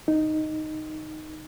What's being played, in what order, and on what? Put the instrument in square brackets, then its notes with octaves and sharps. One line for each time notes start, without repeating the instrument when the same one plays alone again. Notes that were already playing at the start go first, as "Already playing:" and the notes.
[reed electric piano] D#4